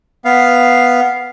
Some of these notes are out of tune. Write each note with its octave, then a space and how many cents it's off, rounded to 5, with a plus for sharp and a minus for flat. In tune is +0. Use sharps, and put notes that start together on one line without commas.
B3 +0 F5 +0